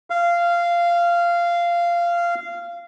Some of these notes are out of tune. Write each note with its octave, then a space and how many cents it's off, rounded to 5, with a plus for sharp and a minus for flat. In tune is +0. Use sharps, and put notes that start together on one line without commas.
F5 -15